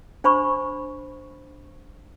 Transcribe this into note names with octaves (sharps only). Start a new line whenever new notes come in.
D4 C5 B5 C#6